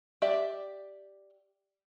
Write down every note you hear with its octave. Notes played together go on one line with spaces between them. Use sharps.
G4 D5 E5